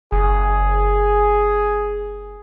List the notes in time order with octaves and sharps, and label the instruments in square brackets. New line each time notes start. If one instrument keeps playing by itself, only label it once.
[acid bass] F#1 [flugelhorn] G#4